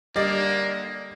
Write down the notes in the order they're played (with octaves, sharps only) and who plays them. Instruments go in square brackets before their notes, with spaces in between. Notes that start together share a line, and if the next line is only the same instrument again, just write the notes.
[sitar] D3 D5 [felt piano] G3 [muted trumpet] A#3 [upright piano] D#5